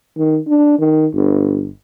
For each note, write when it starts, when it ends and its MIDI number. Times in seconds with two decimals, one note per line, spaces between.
0.17 0.39 51
0.47 0.79 62
0.79 1.06 51
1.14 1.70 31